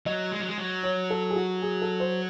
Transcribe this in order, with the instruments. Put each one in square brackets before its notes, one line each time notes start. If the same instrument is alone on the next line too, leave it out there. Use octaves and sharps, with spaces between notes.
[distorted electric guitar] F#3 [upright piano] D#5
[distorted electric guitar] G#3
F#3
G#3
F#3
[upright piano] C#5
A4
G#4
F#4
G#4
A4
C5